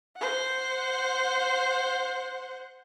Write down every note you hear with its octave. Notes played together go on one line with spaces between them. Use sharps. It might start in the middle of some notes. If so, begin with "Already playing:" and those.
C5 F#5